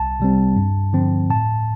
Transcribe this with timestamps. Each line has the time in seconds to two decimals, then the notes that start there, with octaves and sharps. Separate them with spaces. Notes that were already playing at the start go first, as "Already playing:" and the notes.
Already playing: C2 A5
0.20 C3 G3 C4
0.56 G2
0.93 D3 F3 C4
1.30 A2 A5